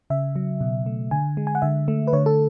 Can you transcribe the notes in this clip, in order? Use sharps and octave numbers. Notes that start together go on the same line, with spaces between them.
C#3 E5
F#3
B2
A3
D3 G#5
G#3
G#5
F#5
D3 E5
A3
B4
D3 C#5
A4